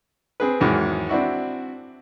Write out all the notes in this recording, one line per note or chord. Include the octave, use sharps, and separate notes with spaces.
C4 G#4 B4
E2 G#2 D#3 F#3 G#3
C4 D4 E4 F#4